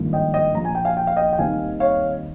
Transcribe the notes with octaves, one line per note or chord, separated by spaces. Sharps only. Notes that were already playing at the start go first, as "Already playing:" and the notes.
Already playing: G#1 G2 F3 A#3 D#4
D#5 G5
D#5 G5
A#1 A#2 F3 A#5
G#5
G5
F5 G#5
G5
F5
D#5 G5
G5
D#2 D#3 G3 C4 D#4 F5 G#5
C#5 F5